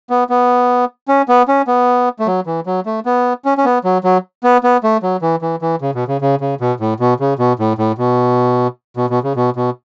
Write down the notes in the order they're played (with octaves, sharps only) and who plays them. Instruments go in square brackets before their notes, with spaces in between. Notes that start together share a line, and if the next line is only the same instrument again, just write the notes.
[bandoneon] B3
B3
C#4
B3
C#4
B3
A3
F#3
E3
F#3
A3
B3
C#4
C#4
B3
F#3
F#3
B3
B3
A3
F#3
E3
E3
E3
C#3
B2
C#3
C#3
C#3
B2
A2
B2
C#3
B2
A2
A2
B2
B2
B2
C#3
B2
B2